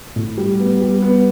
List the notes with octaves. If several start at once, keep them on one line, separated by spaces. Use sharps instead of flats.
A2
G3
B3
G3
B3